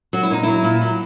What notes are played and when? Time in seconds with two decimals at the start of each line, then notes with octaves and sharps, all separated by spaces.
0.13 F#3 F#4
0.23 E4
0.30 A#2 D#4
0.43 F#3 E4
0.64 A#2
0.81 F#3